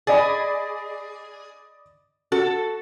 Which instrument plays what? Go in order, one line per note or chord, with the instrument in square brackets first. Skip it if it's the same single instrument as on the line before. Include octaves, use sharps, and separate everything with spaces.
[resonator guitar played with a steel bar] G#4 [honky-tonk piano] D5 D#5 B5
[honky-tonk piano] F#4 [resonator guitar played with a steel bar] A4